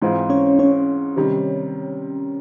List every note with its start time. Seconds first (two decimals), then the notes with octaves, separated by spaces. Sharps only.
0.02 G#2 E3 G#3 C4 F4
0.30 C#4 C#5
0.59 C#4 C#5
1.16 C3 D#3 G3